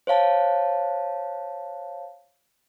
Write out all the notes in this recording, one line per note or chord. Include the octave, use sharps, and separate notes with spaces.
C5 C#5 F5 A5